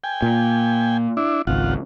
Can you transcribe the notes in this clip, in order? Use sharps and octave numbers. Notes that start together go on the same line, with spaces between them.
G5 G#5
A#2
D4 E4
G#1 C#2 F4 F#5